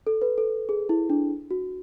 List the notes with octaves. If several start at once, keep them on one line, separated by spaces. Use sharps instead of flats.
A4
B4
A4
G#4
E4
D4
F#4